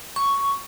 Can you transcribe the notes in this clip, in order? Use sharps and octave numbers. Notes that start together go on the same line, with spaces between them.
C#6